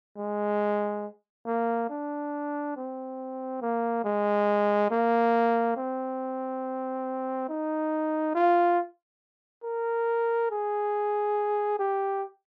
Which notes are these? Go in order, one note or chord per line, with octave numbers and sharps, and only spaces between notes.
G#3
A#3
D4
C4
A#3
G#3
A#3
C4
D#4
F4
A#4
G#4
G4